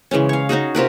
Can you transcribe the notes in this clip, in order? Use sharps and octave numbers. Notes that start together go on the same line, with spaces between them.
C#3 E3 G#3 C#4
C#5 F5
C#4 D#4 F#4 G#4
C3 F4 A#4 B4